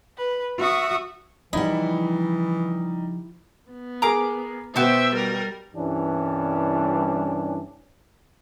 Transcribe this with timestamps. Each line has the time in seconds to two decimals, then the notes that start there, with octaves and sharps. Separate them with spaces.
0.17 B4
0.58 F#4 E5 C#6 D#6
1.53 C#3 E3 F3 G3 D#4 E4 F#5
3.71 B3
4.02 G#4 A#4 A#5 D6
4.76 B2 B3 F#4 G4 C5 E5 G5
5.14 G3 A#4
5.75 C2 G2 E3 G3 C#4 D4